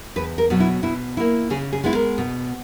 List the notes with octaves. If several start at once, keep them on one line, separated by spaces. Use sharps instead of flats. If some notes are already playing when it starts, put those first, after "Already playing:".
E2 B4
A#4
B2 F#3
E4
B2 E4
A#3 E4
C#3 G#4
G#4
G#3 B3 E4
A#4
B2